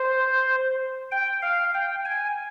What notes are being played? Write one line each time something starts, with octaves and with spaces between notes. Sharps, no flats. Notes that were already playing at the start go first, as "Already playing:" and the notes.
Already playing: C5
G5
F5
G5
G#5